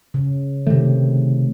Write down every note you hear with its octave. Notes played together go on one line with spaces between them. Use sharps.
C#3
C3 D#3 A3